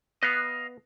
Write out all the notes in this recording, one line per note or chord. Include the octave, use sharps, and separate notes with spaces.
B3 D#5 F5